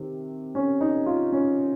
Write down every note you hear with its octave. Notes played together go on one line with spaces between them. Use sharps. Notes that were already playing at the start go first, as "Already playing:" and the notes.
Already playing: C3 D#3
C#4
D#4
F4
C#4